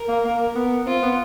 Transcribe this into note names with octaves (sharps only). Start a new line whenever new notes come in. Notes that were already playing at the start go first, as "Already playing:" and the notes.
Already playing: A#4
A#3
A#3
B3
C4 F4
B3